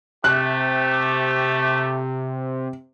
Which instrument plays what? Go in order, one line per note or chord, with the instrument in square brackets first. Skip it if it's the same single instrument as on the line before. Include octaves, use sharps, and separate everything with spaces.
[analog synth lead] C3 [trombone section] A3 G4 [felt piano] F#6